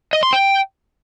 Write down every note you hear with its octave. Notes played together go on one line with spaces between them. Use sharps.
D#5
C6
G5